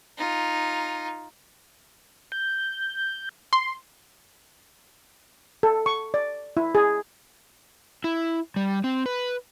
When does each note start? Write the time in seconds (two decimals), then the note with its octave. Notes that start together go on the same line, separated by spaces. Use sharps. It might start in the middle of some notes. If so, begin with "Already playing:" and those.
0.18 D#4 F4
2.32 G6
3.53 C6
5.63 A4
5.86 C#6
6.14 D5
6.57 E4
6.75 G#4
8.04 E4
8.56 G3
8.84 C4
9.06 B4